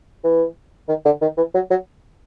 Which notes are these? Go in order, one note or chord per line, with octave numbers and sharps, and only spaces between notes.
E3
D#3
D3
D#3
E3
F#3
F#3